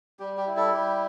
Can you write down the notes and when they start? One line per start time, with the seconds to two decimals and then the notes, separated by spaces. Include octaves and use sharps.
0.19 G3 G4
0.37 G4
0.47 E4
0.56 A4
0.74 G3 G4